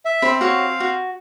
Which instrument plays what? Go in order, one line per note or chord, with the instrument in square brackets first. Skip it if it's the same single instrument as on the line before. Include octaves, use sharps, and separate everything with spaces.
[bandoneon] E5
[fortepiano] C4 [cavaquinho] B5
[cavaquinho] F#4 C#5 C#6 [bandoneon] F5
[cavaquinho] F#4